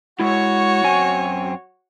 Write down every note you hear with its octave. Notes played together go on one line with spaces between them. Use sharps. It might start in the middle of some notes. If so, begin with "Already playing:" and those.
G#3 E4 F#4 C#5
F#2 C4 G#5